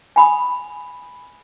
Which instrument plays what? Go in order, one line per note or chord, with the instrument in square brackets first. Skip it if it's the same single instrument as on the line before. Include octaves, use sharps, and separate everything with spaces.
[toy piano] G#5 B5 D#6